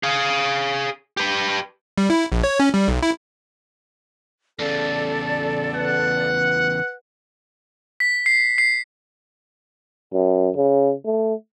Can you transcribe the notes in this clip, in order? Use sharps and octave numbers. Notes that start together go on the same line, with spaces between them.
G#4 F5
G4 B4
G3
E4
A#1
C#5
C#4
G3
B1
E4
E2 C#3 A4 D5
B4 F#5
B6
C7
C7
F#2
C#3
A3